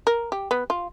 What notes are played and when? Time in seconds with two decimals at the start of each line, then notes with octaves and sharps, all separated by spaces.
0.07 A#4
0.32 G4
0.51 B3
0.70 F4